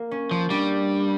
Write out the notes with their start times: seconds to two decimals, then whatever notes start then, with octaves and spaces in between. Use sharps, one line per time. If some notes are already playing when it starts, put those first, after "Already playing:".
Already playing: A#3
0.11 C#4
0.31 F3
0.50 G3 D4